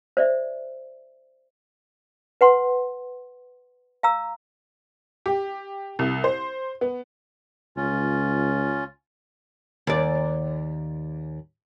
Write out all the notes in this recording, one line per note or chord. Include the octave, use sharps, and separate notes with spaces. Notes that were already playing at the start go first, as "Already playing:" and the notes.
C5 D5 E5
B4 F#5 C6
F5 A#5 E6
G4
C2
C5
B3
C#2 C#4 F4
D#2 D5